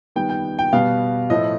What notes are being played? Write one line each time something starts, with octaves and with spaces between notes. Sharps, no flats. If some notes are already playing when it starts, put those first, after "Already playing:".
D#3 G3 B3 G5
G5
G5
B2 G3 B3 F5
A2 F3 A3 D#5